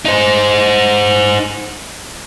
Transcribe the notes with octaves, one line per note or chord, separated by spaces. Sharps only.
D#4 C5